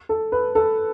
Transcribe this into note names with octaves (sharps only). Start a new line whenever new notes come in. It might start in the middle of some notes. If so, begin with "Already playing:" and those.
A4
B4
A4